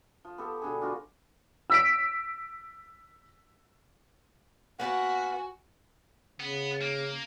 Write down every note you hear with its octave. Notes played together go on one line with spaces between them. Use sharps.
F3
B3 G4 A4
B2 D3 G3 G#4
D4 F4 F#4
E6 B6 D7
A#3 B3 F#4 F#5 G#5
C#3 B3
A#3